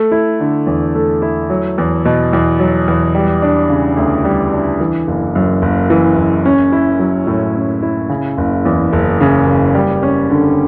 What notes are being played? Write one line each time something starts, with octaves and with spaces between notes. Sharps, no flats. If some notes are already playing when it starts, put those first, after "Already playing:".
Already playing: A3
E4
D3
E2
A3
E4
F#3
E2
B2
E2
F#3
E2
G3
D4
C#3
D2
G3
D4
E3
F#1
F#2
F#1
E3
F#1
C#4
E4
F#3
A2
C#4
E4
C#3
F#1
E2
F#1
C#3
F#1
G3
C#4
D3